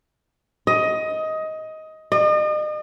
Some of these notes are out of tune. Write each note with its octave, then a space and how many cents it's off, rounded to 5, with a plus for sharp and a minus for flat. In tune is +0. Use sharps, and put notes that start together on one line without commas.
D#5 +15
D#5 -40